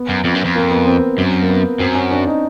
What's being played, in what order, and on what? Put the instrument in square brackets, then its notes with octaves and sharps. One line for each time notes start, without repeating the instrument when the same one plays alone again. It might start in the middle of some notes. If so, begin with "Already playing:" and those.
Already playing: [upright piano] B3
[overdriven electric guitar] F#2
F2
F#2
F2
[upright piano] A#3
B3
C4
[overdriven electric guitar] F#2
[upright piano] A#3
B3
[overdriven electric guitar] F#2 [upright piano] C4
[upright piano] C#4
D4
D#4